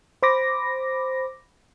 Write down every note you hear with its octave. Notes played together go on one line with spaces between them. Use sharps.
C5 B5 D6 A#6